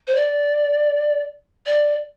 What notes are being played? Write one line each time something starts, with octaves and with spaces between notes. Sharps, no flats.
C5
D5
D5